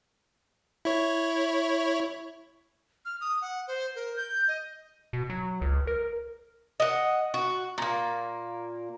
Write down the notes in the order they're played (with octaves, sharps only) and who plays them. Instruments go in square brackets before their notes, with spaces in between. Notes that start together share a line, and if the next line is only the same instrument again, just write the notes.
[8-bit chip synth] E4 C#5
[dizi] F6
D#6
F#5
C5
A#4
G6
D#5
[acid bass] B2
F#3
C#2
A#4
[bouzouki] D#5 F#5
F#4
A#2 A#3